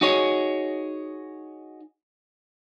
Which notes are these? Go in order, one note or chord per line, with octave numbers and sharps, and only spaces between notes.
D#4 F#4 G#4 C#5